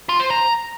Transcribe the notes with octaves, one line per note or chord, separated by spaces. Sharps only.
F4
C5
A#5